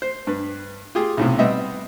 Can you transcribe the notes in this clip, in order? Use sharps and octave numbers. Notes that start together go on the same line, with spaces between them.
C5
G2 B4
F4 G4 G#4
B1 A2 C3
G3 B3 C4 D#5 E5